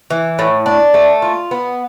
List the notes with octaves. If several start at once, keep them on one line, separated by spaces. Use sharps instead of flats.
E3
A2
D4
A3
F4
B3